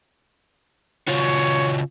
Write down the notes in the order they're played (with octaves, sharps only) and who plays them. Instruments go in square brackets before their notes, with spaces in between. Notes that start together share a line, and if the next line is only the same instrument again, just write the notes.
[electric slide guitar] C#3 F4 F#4 [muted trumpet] C#5